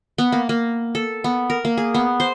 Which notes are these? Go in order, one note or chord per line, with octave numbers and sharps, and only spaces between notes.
B3
A#3
A#3
A4
B3
A#4
A#3
G#4
B3
C5